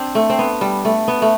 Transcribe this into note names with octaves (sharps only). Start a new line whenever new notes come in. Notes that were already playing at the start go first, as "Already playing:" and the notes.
Already playing: C4 D4
A3
C4
B3
G3
A3
B3
A3